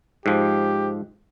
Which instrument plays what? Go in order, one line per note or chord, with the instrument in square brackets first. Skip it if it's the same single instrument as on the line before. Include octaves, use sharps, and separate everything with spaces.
[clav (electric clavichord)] G#2 F3 [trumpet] G4